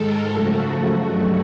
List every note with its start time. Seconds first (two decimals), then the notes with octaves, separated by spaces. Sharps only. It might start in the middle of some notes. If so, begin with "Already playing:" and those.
Already playing: G#2 D#3 G#3 A4 A#4
0.27 F#2 C#3 F3 A3 F#4
0.94 G2 D#3 F#3 A3